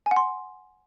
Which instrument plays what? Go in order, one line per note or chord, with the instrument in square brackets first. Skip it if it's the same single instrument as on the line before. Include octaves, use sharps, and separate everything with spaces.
[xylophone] G#5
F#5
C6